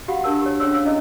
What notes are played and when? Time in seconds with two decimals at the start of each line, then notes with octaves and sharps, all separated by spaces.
0.08 F#4 G4 F5 F#5 B5
0.24 D4 G4 A#4 A5 E6
0.41 G4 C#5
0.60 C#4 D4 G#4 C#5 C6 E6
0.73 F5 E6
0.85 C#4 E4 D#5